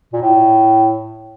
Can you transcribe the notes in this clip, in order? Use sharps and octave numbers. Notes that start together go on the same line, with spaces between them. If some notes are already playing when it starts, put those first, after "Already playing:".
A#2
A2